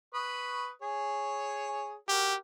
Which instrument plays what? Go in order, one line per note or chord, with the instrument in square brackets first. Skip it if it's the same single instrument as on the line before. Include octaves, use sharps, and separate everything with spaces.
[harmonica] B4 C#6 D#6
G#4 C#5
[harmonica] F#4 A#4 [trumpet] G4